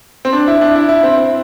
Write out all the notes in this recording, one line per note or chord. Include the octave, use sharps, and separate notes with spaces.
C4
D4
E4
D4
E4
E4
C4
C4